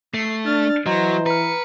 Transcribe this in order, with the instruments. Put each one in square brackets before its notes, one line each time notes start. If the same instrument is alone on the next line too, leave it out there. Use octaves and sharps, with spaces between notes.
[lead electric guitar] A3 [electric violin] C7
[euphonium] D4 [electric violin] F6 A6
[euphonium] E3 [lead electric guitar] F#3 [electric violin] C5 A#6 [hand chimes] D#5 A#5
[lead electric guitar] B4 [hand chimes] A#5 F6 [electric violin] C#7